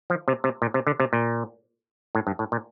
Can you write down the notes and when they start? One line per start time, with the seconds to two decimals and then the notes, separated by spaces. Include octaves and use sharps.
0.10 F3
0.28 C3
0.44 C3
0.62 A#2
0.74 C3
0.87 D3
1.00 C3
1.13 A#2
2.15 A2
2.27 G2
2.39 A2
2.52 A#2